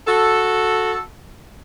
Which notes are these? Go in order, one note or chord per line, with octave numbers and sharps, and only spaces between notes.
F#4 A4